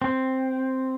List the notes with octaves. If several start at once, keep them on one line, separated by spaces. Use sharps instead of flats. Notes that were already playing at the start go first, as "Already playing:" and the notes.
C4